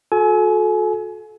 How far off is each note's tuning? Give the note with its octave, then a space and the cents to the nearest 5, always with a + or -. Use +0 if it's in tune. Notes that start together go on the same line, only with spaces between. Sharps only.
F#4 -40 A4 -25 G#5 +30